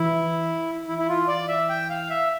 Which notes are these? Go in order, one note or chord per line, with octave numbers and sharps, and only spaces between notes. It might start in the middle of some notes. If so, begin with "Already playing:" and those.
Already playing: E3 E4
E3 E4
E4
F4
D5
E5
G5
F5
E5